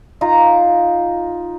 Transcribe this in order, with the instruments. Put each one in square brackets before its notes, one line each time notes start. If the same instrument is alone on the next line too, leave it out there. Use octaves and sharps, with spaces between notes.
[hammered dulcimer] D#4 F4 A#5